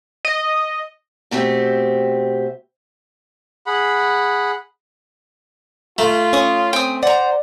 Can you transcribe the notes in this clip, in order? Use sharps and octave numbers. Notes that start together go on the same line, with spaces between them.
D#5
B2 A3 C4 G4
G#4 F#5 B5
A3 F4 A#5
C#4 C#6 D#6
C4 G5 G#5 D#6
C5 D5 F#5 A#5